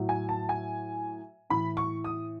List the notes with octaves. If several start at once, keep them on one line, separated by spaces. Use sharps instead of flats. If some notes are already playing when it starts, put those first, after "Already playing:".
Already playing: A2 F#3
G#5
A5
G#5
A2 E3 B5
C#6
D#6